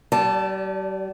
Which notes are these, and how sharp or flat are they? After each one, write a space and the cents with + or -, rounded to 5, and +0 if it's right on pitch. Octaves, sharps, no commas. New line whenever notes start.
G3 -40 D5 +0 A5 +0